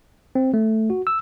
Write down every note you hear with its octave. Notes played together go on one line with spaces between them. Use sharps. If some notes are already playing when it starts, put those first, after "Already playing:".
C4
A3
F#4
E6